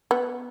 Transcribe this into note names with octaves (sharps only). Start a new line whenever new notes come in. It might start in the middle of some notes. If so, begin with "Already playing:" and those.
B3